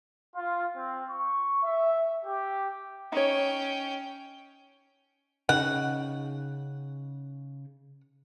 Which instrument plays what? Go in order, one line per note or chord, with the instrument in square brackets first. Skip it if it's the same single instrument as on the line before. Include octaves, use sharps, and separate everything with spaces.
[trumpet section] F4
C4
C#6
E5
G4
[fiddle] C#4 G5 [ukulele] D#4 C#5
[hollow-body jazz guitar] C#3 D#4 G5 [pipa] F#5